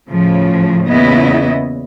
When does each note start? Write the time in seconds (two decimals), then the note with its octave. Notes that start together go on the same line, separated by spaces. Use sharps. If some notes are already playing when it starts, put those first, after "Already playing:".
0.10 A2 C#3 F3
0.88 E2 A#2 C#3 B3 E4 D#5